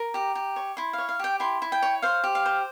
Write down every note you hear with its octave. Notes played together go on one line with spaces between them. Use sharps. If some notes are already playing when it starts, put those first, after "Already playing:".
Already playing: A#4
G4 A#5
G4
C#5
E4 C6
F5
C#5
F5
G4 G5
E4 C6
E4
G5
C#5
C5 F5
G4
F5
C5